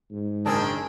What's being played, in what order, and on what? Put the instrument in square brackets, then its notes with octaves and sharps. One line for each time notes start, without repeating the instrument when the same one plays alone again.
[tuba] G#2
[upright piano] F#1 A5 [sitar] D#3 C4 D4 [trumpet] G#4